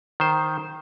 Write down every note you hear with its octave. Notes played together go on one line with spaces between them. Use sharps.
D#3 C5